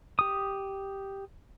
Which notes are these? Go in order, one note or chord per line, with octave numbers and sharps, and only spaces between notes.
G4 D#6